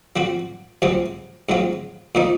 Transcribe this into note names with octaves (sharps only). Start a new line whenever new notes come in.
F3 C4 F#4
C#2 C3 F#3 C4
G#2 F#3 C4 F4
A#2 F3 A#3 D#4